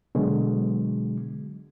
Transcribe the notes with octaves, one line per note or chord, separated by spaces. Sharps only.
B2 D3 F#3 G#3